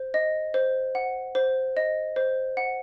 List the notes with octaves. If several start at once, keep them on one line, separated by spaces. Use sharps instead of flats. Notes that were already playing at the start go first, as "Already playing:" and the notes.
Already playing: C5
D#5
C5
F#5
C5
D#5
C5
F#5